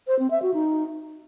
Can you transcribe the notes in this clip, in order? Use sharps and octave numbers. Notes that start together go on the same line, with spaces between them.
C5
C4
E5
F#4
D#4